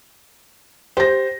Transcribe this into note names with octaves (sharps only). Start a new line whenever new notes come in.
G4 C5 A#6